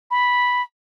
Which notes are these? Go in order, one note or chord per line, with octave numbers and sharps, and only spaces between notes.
B5